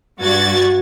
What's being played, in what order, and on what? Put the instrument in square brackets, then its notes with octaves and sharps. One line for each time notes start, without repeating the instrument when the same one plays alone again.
[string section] G2 F#4 G#6 A6